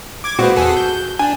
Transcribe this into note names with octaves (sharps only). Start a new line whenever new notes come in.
D6 G#6
A#2 G#3 C4 F#4 B4
E2 G#4 A4
G6
D4 G#5